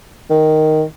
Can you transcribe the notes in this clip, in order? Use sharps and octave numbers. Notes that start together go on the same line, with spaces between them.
D#3